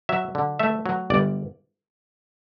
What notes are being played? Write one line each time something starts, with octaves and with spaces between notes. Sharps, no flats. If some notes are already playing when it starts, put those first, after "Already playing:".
F#3 E5
D3
A3 E5
F#3
G1 D5